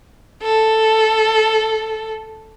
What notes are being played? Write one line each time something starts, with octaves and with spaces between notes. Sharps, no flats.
A4